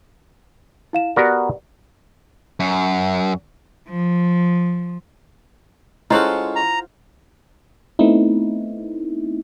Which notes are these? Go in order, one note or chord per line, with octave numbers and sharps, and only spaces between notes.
E4 F5 E7
B3 F#4 G4 A#4 B4 D5
F#2
F3
G#3 C#4 E4 F4 A4 C5 F#5
A#5
A3 B3 C4 D#4 E4